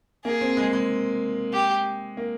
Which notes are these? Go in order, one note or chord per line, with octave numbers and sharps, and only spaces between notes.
A#3 G#4
C4
G#3
G#3
G4
A#3